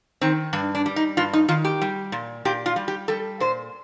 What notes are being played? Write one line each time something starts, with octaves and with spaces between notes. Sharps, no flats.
D#3 C4
G2 D4
D4
G3
D#4
G2 F4
D#4
D#3 F4
G4
G3
A#2
A#2 G4
F4
G3
G4
G3 A4
A#2 C5